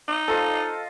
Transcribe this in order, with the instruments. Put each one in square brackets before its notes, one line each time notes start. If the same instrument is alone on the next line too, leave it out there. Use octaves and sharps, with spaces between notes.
[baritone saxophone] D#4
[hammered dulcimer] F4 C5 D#5 [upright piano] A4